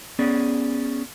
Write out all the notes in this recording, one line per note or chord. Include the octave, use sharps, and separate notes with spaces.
B3 C#4 G#4 D5